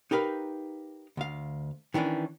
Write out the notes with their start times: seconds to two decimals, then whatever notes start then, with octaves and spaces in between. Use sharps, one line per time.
0.11 D#4 G4 A#4 B4 F5
1.17 D2 F5
1.94 D#3 E3 C#4 D4